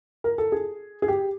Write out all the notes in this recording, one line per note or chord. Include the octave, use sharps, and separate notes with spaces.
A#4
A4
G#4
G#4
G4